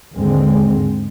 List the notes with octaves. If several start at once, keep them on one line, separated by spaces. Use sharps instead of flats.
D#2 G#2 D3 G#3 C4